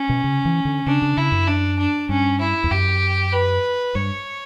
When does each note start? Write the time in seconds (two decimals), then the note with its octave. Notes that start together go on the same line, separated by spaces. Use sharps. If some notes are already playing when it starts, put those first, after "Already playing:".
Already playing: C#4
0.09 B2
0.24 C#3
0.45 E3
0.65 D3
0.86 C#3 D4
1.02 C#3
1.17 C#3 E4
1.32 F#2
1.47 D4
1.78 D4
2.09 G2 C#4
2.40 E4
2.64 E2
2.71 F#2 G4
3.32 B4
3.95 G2 C#5